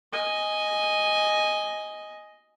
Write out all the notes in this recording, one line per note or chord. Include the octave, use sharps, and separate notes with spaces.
D#5 G#5